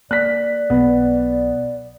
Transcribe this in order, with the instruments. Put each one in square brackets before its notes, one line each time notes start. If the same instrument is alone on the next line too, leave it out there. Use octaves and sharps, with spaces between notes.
[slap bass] A#3 [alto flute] D5 [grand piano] F#6 B6
[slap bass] B1 F#3 [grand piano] B3